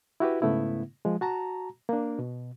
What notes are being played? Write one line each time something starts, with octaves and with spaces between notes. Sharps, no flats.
E4 F#4 G4 B4
G#2 C#3 A3 B3 E4
F3 G#3
F#4 A5 A#5
A#3 D4
B2